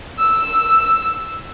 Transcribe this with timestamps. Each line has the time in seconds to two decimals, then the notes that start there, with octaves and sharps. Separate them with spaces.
0.19 E6